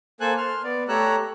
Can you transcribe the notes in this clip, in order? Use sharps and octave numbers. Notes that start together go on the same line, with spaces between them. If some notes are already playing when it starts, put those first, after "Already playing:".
A#3 A4 C5 G#5 F#6
C6 F6
B3 D5
A3 G4 C#5 A#5 E6 F#6